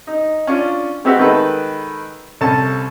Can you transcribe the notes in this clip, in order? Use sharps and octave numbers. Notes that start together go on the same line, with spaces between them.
D#4
C#4 D4 F4
G#3 B3 C4 F#4 G4 E5
D#3 G#3 A4 B4
C2 C#4 A4 A5